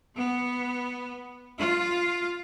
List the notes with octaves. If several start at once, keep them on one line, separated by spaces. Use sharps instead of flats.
B3
F4